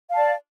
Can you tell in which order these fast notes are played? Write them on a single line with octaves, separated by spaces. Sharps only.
F5 A5 D5